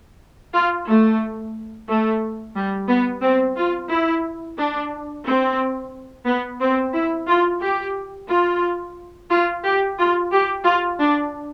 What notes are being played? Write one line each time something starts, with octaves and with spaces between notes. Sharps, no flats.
F4
A3
A3
G3
B3
C4
F4
E4
D4
C4
B3
C4
E4
F4
G4
F4
F4
G4
F4
G4
F4
D4